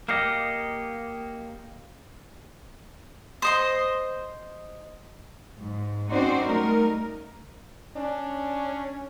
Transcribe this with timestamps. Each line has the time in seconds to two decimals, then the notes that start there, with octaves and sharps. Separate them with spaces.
0.08 A#3 G4 D#5 F6 C7 C#7
3.42 C5 D#5 C6
5.58 G#2
6.11 C4 C#4 D#4 F#4 C5 D5
6.46 G3 A3 D#4 A#4
7.97 C#4 D4